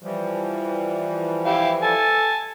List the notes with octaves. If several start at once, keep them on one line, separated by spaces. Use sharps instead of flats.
E3 F3 G3
E4 G4 F5
A4 G#5 A5